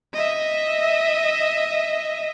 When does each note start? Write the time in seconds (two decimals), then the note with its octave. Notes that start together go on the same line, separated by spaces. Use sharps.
0.14 D#5 E5